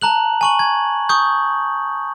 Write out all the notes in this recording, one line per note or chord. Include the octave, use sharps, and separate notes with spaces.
A5 A#5 F#6 F#7
G#5 C#6 F#7
G#6
C#6 D#6 G6